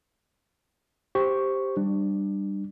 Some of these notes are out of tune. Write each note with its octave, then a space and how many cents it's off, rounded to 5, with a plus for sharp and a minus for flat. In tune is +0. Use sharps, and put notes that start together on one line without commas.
G4 +0 C5 +5 C#6 +0
G3 +0 D4 +25